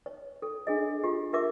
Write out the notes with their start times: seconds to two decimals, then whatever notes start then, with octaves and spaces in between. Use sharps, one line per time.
0.06 C#5
0.42 A4
0.67 D4 G#4 D#5
1.04 F4 G4
1.33 G4 A#4 E5 D6